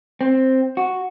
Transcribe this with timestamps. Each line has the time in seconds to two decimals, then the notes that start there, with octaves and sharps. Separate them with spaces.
0.21 C4
0.77 F#4